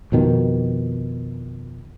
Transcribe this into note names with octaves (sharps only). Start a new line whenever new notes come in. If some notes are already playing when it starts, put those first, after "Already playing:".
F2 B2 D#3